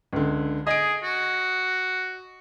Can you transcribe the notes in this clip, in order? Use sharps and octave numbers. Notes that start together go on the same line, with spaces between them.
C#2 D3
G#4 D#5 D7
F#4